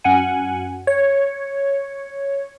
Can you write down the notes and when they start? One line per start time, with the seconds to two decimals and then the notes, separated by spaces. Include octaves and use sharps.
0.04 F#2 F#5 G#5
0.87 C#5